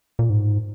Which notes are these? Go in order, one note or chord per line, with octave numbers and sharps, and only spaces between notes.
A#2
G#2